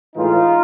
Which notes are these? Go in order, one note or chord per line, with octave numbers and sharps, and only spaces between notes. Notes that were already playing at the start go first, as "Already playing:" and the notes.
A2 E3 G#3 D#4 F4